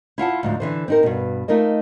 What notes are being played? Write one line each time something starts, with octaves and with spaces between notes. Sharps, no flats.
E4 F4 F#5 A5
D2 G#2 F3
D3 E3 C5
C4 D#4 A#4
G2 B2
A3 D#4 F4 A#4 D#5